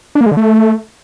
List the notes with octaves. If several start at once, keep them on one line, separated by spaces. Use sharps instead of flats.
D4
A#3
G#3
D3
A3